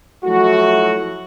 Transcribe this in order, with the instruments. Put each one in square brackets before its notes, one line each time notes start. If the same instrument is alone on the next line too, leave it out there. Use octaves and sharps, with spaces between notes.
[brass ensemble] F3 F#3 A3 E4 F#4